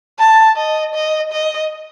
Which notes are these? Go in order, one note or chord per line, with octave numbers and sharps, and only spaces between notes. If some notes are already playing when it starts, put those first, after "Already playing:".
A5
D#5
D#5
D#5